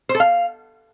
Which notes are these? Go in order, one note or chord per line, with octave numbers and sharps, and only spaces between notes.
C5
A4
F5